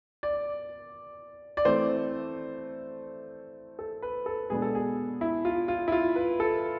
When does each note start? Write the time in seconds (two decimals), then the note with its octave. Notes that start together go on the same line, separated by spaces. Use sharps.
0.23 D5
1.57 D5
1.65 E3 A3 C4 C5
3.79 A4
4.02 B4
4.26 A4
4.50 B2 G#3 B3 D4 G#4
4.62 A4
4.75 G#4
5.21 E4
5.45 F4
5.68 F4
5.88 E4
5.92 F4
6.15 B4
6.40 A4